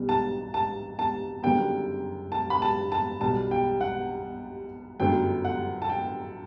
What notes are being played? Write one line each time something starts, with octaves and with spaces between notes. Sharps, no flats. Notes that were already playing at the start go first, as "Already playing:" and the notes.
Already playing: B1 B2 G3 B3
A5
A5
A5
F#1 F#2 D3 G3 B3 G5
A5
B5
A5
A5
B1 B2 G3 A5
G5
F#5
G1 F#2 D3 F#3 A3 G5
F#5
A5
G5